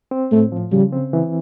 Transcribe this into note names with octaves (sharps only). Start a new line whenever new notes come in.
C4
A2 A3
F3
C#3 G3
C4
E3